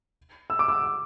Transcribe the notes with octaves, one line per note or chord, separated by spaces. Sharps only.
E6
D6
E6